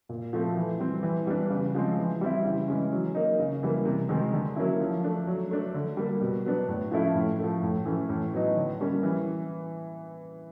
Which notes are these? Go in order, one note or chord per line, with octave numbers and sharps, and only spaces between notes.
A#2
F3 A3 C4
E3
G3 C4
E3
G3 B3 D4
C#3
F3 G#3 C4
E3
G3 C4 E4
C#3
E3 G#3 C#4
F#3
A#3 D#4
C#3
E3 G3 A#3
C3
D#3 G#3 C4
D3
F#3 A#3 C#4 E4
F3
A3 D4
F#3
A3 D4
D3
G3 A#3
B2
F#3 B3 D4
A2
F3 A3 C#4 E4
A2
F3 A3
A2
E3 A3 C#4
A2
F#3 B3 D#4
D3
G3 A#3 C#4
E3